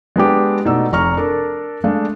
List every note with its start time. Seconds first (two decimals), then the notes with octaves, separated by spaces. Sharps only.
0.16 G#3 B3 D4 G4
0.65 B2 A3 D#4 D5 E6
0.92 F1 A#5 C#6 F6
1.17 D4 A4 A#4 D5
1.84 G#3 A3 D4 F5